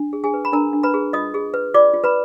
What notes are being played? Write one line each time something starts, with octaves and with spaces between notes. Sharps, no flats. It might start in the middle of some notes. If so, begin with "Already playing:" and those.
Already playing: D4
G#4
G#4 G#5
B4
B5
D4 A#4 A#5
D4
B4 B5
G#4
F4 D#5 D#6
G#4
B4
F4 D5 D6
F4
B4 B5